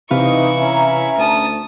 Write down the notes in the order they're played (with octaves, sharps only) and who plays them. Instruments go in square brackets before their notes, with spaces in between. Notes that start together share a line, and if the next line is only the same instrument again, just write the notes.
[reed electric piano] C3 B4 F5 [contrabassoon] E3 [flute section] D#4 [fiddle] E4 C#6
[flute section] C#4 E5 A#5
[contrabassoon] D2 [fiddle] A5 D#6